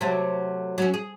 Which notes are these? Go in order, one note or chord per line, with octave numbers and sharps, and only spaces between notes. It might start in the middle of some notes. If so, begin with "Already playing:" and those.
C3 F#3 A3
F#3 C#4
G#4